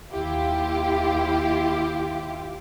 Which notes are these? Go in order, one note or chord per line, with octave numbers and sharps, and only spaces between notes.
D#2 E4 F4 G4